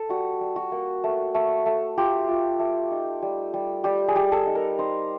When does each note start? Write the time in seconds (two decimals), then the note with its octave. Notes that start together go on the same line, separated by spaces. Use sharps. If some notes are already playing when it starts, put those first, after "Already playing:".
Already playing: A4
0.09 G3 F#4
0.41 G3
0.56 F#4
0.72 A#3
1.04 A3
1.35 A3
1.66 A3
1.97 F4 G4
2.29 F4
2.59 A3
2.91 D#4
3.22 G3
3.54 G3
3.84 G3 G4
4.08 G#4
4.16 G3
4.32 A4
4.46 D#4
4.55 A#4
4.79 D#4 C5